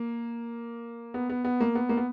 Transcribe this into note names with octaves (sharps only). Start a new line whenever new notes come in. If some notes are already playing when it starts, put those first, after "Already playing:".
Already playing: A#3
B3
B3
B3
A#3
B3
A#3
B3